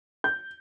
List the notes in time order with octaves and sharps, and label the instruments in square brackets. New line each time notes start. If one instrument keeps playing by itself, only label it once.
[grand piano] G6